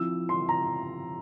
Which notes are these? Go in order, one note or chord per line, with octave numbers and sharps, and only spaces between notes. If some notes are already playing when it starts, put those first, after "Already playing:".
Already playing: F3 C4 E4 E6
C6
A#5